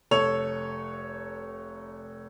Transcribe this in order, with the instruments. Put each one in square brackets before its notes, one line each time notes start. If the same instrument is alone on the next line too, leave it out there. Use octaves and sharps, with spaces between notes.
[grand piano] F1 A4 C#5 F7